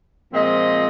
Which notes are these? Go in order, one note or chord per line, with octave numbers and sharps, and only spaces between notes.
A#2 F3 G#3 C4 D#5